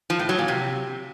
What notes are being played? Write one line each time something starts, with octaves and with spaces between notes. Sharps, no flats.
F3
A2
F#3
A#2
C3